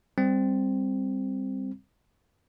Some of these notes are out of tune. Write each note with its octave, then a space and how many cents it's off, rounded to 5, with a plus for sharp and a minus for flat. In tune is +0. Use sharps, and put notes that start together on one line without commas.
G3 +15 C4 +0